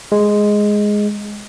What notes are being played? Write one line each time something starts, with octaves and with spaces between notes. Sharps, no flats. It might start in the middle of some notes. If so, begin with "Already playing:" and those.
G#3